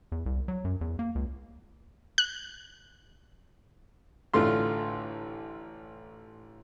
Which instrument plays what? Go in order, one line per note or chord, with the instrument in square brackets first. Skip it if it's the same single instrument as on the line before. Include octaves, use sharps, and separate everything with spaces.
[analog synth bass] E2
C2
F#3
F#2
E2
A#3
C#2
[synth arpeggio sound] F#6
[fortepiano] A1 D3 A3 F4 C6